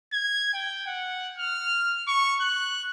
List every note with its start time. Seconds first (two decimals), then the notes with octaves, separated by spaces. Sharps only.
0.13 G#6
0.54 G5
0.87 F#5
1.39 F6
2.08 C#6
2.41 F#6